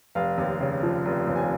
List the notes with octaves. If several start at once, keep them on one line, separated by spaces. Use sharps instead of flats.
F1 F5
D#2
C#3
F3
F1
D#2
G#5